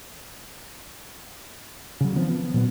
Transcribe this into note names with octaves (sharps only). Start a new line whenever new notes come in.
C#3 F#3
D#3 F3 B3 C4
B3
A#2 F#3 B3